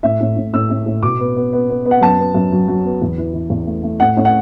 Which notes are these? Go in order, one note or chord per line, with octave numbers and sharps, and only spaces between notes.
A2 E5
A2
A2
A2 E6
A2
A2
B2 D6
B3
B3
B3
B3
B3
F#5
F#2 A5
B3
F#2
F#3
F#3
B3
E2
E3
E3
E2
A3
A3
A2 F#5
A2
F#5